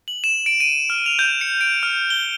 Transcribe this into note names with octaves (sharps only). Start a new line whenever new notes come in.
F#7
E7
D7
D#7
F6
F7
G6
C#7
D7
F6
G7